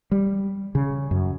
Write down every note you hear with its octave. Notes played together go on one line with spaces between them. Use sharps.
G3
C#3
F#2